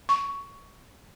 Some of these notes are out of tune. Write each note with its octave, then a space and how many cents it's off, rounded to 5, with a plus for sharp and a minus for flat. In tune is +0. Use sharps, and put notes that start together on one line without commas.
C#6 +10